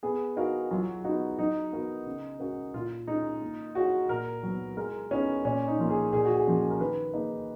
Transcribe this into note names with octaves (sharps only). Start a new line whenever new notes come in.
B3 G#4
D#4 F#4 A#4 F5
F#3 F4
B3 D#4 F#4
F#3 D#4
B3 F#4 A#4
C#3
G#3 C#4 F#4 A#4
A#2 F4
G#3 C#4 D#4
A#3
D#4 F#4 G#4 C#5 F5
A#2 A#4
F#3 B3
G#3 A#4
B3 C#4 D#4 G#4
A#2 C#4
D#4
F3 A#3 F4
G#4
A#2 G#4
F#4
G#4
F3 A#3 C#4
A#4
D#3 B4
A#3 D#4 G#4